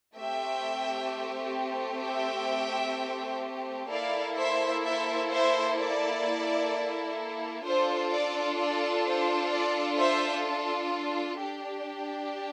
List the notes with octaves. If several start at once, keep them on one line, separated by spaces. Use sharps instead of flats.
A3 C4 G4 E5 G5
E5 G5
A#3 E4 A4 D5 F5
C5 E5
C5 E5
C5 E5
D5
D4 F4 A4 C5
D5
D5
C5
D5
C5 E5
D4 G4